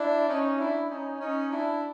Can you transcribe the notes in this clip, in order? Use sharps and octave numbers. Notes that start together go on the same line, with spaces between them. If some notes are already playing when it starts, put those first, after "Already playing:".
Already playing: D4 E4
C#4 D#4
D4 E4
C#4 D#4
C#4 D#4
D4 E4